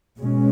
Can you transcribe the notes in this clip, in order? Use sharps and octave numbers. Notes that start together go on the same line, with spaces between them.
B2 G#3 C#4